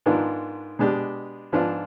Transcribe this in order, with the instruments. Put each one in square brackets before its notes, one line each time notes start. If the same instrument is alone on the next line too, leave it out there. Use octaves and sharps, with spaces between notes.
[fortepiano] G#2 D#3 B3 D4 F4
B2 G#3 D4 G4
G#2 F3 B3 D4 F4